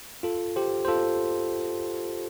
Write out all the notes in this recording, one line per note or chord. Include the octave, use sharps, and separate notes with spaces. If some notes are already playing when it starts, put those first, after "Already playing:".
F4 A4
G4 C5
C5
F4 A4